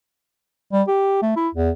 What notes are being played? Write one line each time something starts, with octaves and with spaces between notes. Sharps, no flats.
G3
G4
A3
E4
E2